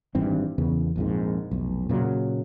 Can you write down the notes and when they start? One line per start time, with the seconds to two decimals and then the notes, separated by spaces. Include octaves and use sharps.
0.15 G#1 G2 E3 C4
0.58 E2 C#3 B3
0.96 A#1 F2 G#2
1.51 F1 B1
1.89 A#2 C#3 E3 F#3